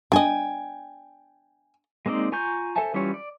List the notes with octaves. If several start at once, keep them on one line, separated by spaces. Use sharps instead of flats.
D4 D#5 G5 G#5
G#3 A#3 C4 D#4 D5
F4 G#5 A#5 C#6 G6
A4 C5 E5 G#5 A5
E3 G3 C#4 F4 C#5
D5